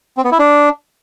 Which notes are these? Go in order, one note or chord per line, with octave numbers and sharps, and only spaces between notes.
C4
B3
E4
D4